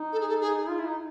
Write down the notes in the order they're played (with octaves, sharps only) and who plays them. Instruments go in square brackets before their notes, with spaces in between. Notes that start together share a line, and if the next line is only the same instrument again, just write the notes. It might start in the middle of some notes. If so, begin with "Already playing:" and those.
Already playing: [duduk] D#4
[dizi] A4
G#4
A4
G#4
[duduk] F4
E4
D#4